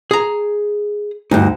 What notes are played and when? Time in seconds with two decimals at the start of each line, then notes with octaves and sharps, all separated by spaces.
0.11 G#4 A#5
1.31 D2 G2 D#4